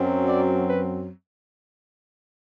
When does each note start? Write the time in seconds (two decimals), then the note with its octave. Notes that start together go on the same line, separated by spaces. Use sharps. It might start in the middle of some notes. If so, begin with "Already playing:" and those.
Already playing: F#2 F#3 C4
0.26 D5
0.67 B4